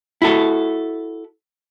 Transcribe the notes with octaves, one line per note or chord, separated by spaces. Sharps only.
E4 F#4 A4